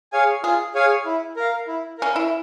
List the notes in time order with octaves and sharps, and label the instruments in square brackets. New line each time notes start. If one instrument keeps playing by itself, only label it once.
[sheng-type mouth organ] G#4 C#5 F5 G#5
[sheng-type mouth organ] F4 [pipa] G#4
[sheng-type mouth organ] G#4 C#5 F5 G#5
E4
A#4 F5
E4
[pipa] C#4 [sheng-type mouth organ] A#4 F5
[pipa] E4